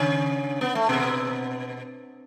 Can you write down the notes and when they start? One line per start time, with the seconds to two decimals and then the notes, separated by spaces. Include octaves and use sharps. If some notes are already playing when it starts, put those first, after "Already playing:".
Already playing: C#3 C#4
0.61 B3
0.75 A3
0.89 B2 B3